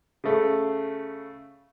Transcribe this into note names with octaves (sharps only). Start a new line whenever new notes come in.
C#3 A3